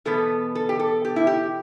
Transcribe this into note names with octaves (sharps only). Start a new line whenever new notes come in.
E2 B2 B3 A4
A4
G4
A4
G4
E4
G4